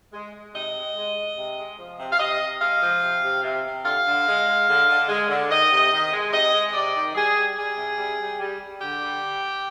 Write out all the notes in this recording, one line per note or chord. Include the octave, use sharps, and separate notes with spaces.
G#3
G#3
C3 D#5
G#3
G#3
G#3
C3
G#3
F3
C3
F5
C3 D#5
C3
G#3 F5
F3
C3
C3
C3
C3
D3 F5
D3
G#3
G#3
D3
D3
G#3
D3
D#3 D#5
C3
D#3
G#3
C3 D#5
G#3
C3 D5
D#3
G3 G#4
G3
G3 G#4
C3
G3
G3
G3
G3
D3 G4
G3